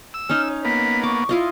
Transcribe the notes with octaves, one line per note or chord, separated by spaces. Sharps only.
E6
C#4 D#4 F6
C#5
A#3 B3 B6
C#6 D6
E4 F4 D#5